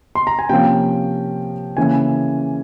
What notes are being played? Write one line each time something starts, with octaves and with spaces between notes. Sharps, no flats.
C6
A#5
G#5
C3 F3 A#3 C#4 G5
C#3 E3 A#3 C#4 G#5